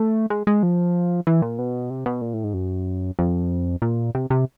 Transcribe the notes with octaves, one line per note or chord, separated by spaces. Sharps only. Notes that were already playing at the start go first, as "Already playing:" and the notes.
Already playing: A3
G#3
G#3
F3
E3
A#2
B2
C3
B2
A#2
A2
G#2
F#2
F2
A#2
C3
C3